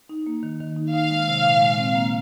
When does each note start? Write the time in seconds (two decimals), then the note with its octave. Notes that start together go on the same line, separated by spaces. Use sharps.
0.09 D#4
0.27 A#3
0.43 D#3
0.60 D#3
0.76 D#4
0.94 D#4 F5
1.10 G#3
1.28 C3
1.45 A#2
1.61 G#3
1.78 C4
1.95 A#3